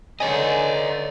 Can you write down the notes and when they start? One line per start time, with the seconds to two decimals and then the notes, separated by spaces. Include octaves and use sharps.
0.20 D3 D#4 C#5 D#5 G#5